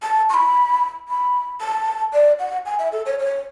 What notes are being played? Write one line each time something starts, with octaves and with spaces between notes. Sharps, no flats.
A5
C#6
B5
B5
A5
D5
F#5
G#5
E5
A4
C#5
C#5